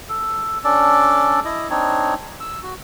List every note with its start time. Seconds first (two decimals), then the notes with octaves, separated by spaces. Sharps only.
0.09 A4
0.64 C#4 D4 A4 D5
1.45 E4 D#5
1.70 C4 D4 D#4 C#5
2.40 E6
2.63 F#4